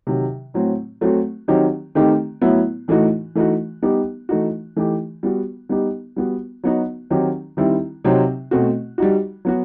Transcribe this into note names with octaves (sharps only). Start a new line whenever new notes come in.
C3 D#3 F#3
A2 F#3 C4
F#3 A3 C4 F#4
D#3 F#3 C4 D#4 G4
D#3 A3 C4 D#4 G4
A2 F#3 B3 E4
A2 E3 A3 D#4 F#4
E3 A3 D#4 F#4
G3 B3 D#4 G4
E3 A3 D#4 F#4
E3 A3 D#4 G4
G3 B3 F#4
G3 B3 D#4 G4
G3 B3 F#4
F#3 B3 D#4 F#4
D#3 F#3 C4 D#4 G4
D#3 G3 C4 E4
C3 F#3 C4 D#4
B2 A3 C4 F#4
G3 D#4 F#4
F#3 B3 F#4